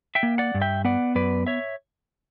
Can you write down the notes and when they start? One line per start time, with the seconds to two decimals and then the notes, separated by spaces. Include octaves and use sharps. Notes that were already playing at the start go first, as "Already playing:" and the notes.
0.15 E5 G5
0.23 A#3
0.38 D5 F#5
0.54 G2
0.61 E5 G5
0.85 B3 D5 F#5
1.15 F#2 B4 D5
1.47 C#5 E5